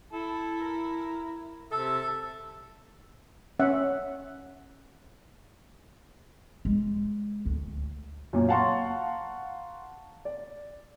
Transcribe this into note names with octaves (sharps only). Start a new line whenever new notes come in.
E4 A4
A#4
C3 A4 E5
C#4 E5 F#5
G#3
D2
F#2 A#2
F5 F#5 A5 A#5 C6 C#6
D5